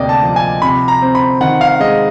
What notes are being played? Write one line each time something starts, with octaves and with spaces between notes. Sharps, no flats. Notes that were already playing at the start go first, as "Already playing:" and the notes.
Already playing: D2 C3 A#3 D5 D#5 G5
A5
F3
G#5
C3 B5
A#5
C4
B5
D#3 F#5
F5
G#3 D#5